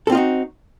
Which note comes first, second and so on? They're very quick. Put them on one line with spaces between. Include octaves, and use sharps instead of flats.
A4 C4 F4 D#4 F#4